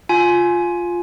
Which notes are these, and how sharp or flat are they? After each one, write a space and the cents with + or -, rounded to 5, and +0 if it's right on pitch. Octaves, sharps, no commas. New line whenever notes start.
F4 +5 G#5 +15